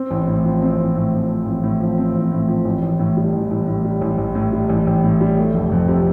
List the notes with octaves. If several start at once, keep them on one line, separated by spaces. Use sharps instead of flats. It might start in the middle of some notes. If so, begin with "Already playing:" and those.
Already playing: C4
A1
A2
F3
C4
A1
A2
F3
C4
A1
A2
F3
C4
A1
A2
F3
A1
A1
A2
G3
A1
A1
A2
G3
A1
A1
A2
G3
A1
A1
A2
G3
A3
F1
F2
C3